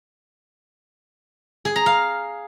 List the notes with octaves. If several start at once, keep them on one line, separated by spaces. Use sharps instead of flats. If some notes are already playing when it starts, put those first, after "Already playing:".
G#4
A#5
F5